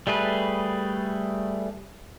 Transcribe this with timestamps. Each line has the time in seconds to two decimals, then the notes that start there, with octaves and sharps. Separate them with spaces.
0.07 G3 A3 G#4 B4